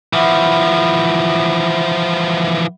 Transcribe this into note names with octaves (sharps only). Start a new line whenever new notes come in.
E3 F3 E5 F#5 B5